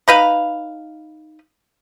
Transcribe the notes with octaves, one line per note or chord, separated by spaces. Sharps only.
D#4 B4 F5